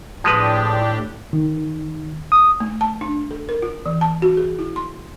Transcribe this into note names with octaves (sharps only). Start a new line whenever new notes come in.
A2 F3 G#3 D4 G4 B4
D#3
D#6
A3
A5
D4
A4
A#4
F4
E3
A5
F#4
G#4
E4
C6